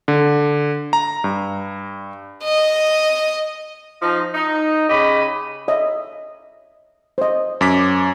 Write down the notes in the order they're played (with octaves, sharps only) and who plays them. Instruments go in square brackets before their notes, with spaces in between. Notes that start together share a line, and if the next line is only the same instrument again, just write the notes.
[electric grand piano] D3
A#5
G2
[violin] D#5
[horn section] F3 D#4
D#4
C#3 G4 D#5 B5
[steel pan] C#5 D#5 E5
C5 D#5
[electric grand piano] F#2 D6 B6